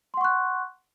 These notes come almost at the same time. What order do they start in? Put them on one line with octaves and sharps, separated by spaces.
C6 F#5 C#6 F#6